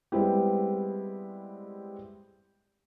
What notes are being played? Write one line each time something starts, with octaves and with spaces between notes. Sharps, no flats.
G3 G#3 B3 C4 E4 G4